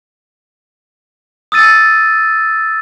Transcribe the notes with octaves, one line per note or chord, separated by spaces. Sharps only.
D#6 E6 A6 D#7